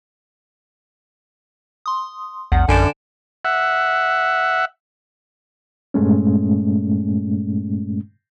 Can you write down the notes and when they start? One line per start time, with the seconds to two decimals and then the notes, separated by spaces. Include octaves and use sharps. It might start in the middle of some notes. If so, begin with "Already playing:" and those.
1.86 C6 D#6
2.52 A#1 E2 F#5
2.69 A#1 F#2 D3 G#5 D7 E7
3.45 E5 F#5
5.94 G2 A#2 G#3 A3 C#4